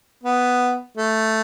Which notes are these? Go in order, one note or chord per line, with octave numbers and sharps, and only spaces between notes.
B3
A3